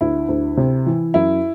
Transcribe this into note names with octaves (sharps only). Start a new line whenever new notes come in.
D2 E4
D2
C3
E3
F#2 E4